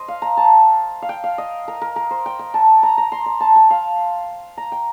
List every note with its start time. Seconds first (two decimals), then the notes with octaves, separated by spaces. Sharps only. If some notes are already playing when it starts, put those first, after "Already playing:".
Already playing: C5 D#5
0.08 F5
0.22 A#5
0.37 A5
1.02 F5
1.09 G5
1.24 F5
1.38 D#5
1.68 A#4
1.81 A#4
1.96 A#4
2.11 C5
2.26 G5
2.39 G5
2.54 A5
2.83 A#5
2.98 A#5
3.12 C6
3.26 A#5
3.40 A5
3.56 G5
3.71 F5
4.57 A#5
4.72 G5